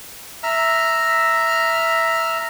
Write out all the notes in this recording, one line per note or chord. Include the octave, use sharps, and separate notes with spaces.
E5 A#5 F6